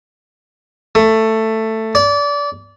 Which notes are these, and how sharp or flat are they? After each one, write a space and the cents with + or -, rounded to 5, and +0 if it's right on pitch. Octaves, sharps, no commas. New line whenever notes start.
A3 +10
D5 -25